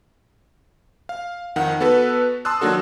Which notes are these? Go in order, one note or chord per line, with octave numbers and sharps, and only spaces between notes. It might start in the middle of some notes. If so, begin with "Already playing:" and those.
F5
F2 D#3 F#5
B3 F#4 A4 B4
A5 C6 D#6 E6 F#6
D#3 F#3 A#3 D4 F#4 A4